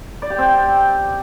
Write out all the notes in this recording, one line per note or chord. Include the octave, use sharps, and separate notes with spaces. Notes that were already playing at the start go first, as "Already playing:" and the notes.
D5
G4
C4